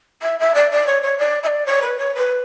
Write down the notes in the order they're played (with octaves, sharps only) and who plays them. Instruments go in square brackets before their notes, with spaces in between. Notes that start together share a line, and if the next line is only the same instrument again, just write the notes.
[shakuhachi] E5
E5
D5
D5
C#5
C#5
D5
E5
D5
C#5
B4
C#5
B4